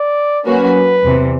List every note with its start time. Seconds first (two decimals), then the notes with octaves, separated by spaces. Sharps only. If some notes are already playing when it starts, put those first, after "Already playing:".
Already playing: D5
0.46 F#3 A#3 C#4 F#4 B4
1.04 E2 C3 E3